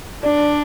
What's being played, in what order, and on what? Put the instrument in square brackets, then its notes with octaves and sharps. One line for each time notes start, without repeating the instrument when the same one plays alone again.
[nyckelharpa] D4 [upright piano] D5